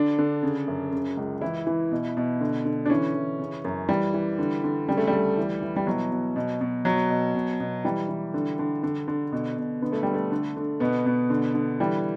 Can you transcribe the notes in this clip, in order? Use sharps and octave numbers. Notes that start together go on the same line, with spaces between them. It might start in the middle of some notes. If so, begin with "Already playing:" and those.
Already playing: D3 D4
D3
C#3
F#2
C#3
C#2
E3 E4
E3
B2
B2
D3
D3
D4
E3 C#4
E3
C#3
F#2
E3 G3
E3
D3
D3
C#3 G3
A3
D2 G3
E3
E3
G3
B2 F#3
B2
B2
B2
B2 F#3
B2
B2
B2
E3 G3
E3
D3
D3
D3
D3
B2
B2
D3 B3
A3
D3 G3
A3
D3
D3
B2 B3
B2
D3
D3
E3 G3